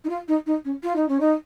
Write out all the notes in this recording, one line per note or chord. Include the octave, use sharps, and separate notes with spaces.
D#4
F4
D#4
D#4
C#4
F4
D#4
C#4
D#4